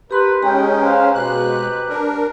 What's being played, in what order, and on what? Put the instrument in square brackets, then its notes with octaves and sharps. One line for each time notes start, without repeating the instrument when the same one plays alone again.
[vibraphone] G4 C6 [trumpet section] A#4 B4
[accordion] G#3 C#4 [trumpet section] D#4 G#4 G5 [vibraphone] A#5
[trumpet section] B4 C5 F5
[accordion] B2 G#3 F#6 [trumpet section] C4 G4 B4
[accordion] D4 A#4